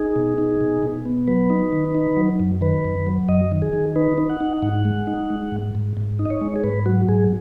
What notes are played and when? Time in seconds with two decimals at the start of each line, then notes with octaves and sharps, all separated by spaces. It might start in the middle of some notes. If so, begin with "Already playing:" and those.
Already playing: D#4 G#4
0.16 B2
0.38 D#4
0.61 B2
0.83 B2
1.06 B3
1.27 F#3 B4
1.50 D#4
1.72 D#3
1.95 D#4
2.17 F#3
2.40 F#2
2.61 D#3 B4
2.85 F#2
3.06 F#3
3.29 F#2 D#5
3.52 D#3
3.62 G#4
3.73 D#3
3.96 D#4 B4
4.18 D#4
4.30 F#5
4.41 D#4
4.62 G#2 F#5
4.85 G#3
5.07 D#4
5.30 G#3
5.52 G#2
5.75 G#2
5.97 G#2
6.19 D#4
6.25 D#5
6.30 C#5
6.41 G#3
6.56 G#4
6.64 G#2 B4
6.86 F#3 F#4
7.08 G#2 G#4